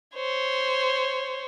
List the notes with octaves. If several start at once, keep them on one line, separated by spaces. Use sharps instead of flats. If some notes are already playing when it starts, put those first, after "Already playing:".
C5 C#5